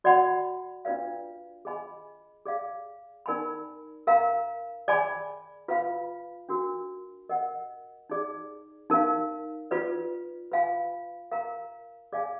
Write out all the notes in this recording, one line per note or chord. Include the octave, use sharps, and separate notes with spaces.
F#4 D5 F#5 B5
D4 F4 B4 D5 F5
G#4 D#5 G#5 B5
G#4 D5 F5
D#4 A#4 D5 G#5 B5
A#4 F5 A#5
G#4 D5 G#5 B5
F4 B4 F5 B5
D4 F#4 A#4
A#4 D#5 F#5
D#4 G#4 D5
D#4 A#4 F5
F4 B4 D5
F4 B4 F5 G#5 B5
A#4 F5 A#5
G#4 D5 F5 G#5